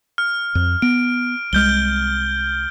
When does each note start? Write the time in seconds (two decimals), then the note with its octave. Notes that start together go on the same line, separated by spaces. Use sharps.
0.18 F6
0.55 F2
0.82 B3 D7
1.53 C2 G#3 F6 G6 G7